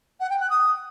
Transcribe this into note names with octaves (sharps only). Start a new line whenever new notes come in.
F#5
G5
F#6
D#6